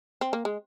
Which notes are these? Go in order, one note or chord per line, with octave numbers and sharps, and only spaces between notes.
C4
A#3
G#3